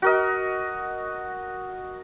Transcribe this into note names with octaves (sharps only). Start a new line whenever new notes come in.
F#4 A#4 D#5